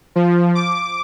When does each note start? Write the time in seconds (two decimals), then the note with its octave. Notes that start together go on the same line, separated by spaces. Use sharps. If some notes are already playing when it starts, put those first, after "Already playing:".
0.16 F3
0.55 D6